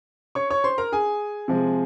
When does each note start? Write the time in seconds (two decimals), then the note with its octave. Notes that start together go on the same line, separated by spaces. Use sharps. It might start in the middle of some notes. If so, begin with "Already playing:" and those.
0.35 C#5 C#6
0.50 C#5 C#6
0.64 C5 C6
0.78 A#4 A#5
0.92 G#4 G#5
1.48 C3 F3 G#3